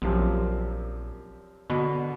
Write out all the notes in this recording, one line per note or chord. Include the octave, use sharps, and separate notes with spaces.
A#1 F#2 C3 F3
B2 D3